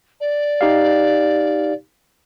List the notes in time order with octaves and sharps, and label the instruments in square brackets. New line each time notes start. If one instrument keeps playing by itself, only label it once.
[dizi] D5
[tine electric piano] D#4 G4 F5